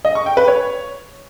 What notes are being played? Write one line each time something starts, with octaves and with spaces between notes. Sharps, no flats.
D#5
C#6
G5
B4
C#5